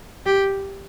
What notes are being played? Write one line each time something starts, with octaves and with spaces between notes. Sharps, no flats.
G4